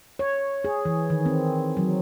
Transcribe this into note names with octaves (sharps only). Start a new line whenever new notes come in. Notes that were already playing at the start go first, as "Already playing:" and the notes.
C#5
G#4
E3
D#3
C4
F#3